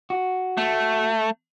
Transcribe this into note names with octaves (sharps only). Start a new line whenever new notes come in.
F#4
A3